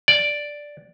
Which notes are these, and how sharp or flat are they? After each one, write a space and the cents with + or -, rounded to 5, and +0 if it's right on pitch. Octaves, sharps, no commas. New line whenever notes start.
D5 +0